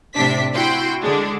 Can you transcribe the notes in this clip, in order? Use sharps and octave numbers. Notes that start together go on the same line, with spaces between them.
A2 C3 D4 B6
E4 F#4 G5 C6
D3 G#3 D4